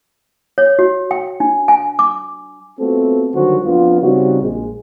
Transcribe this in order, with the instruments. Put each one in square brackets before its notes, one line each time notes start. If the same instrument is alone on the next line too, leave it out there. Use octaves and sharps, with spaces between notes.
[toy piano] C#5
F#4
G5
D4
G#5
D6
[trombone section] A3 B3 C4 F4 F#4 A4
D3 D#3 F#3 G3 F#4 C5
F2 B3 D4 F4
C#3 G3 C4 D#4 F#4
A#1 G#3